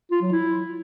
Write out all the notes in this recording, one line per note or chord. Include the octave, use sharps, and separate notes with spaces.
F4
F#3
E4